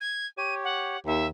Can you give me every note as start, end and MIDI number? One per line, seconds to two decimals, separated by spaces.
0.01 0.27 92
0.38 0.97 67
0.38 0.97 73
0.38 0.55 99
0.64 1.00 78
1.06 1.28 39
1.06 1.26 76